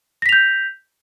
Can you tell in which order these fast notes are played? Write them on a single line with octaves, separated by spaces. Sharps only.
A#6 B6 F7 G6